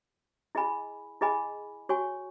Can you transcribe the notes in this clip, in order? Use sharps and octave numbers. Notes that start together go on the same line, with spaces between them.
E4 G#4 D#5 G#5 B5
E4 G#4 D#5 G#5 B5
F#4 C#5 G#5 C#6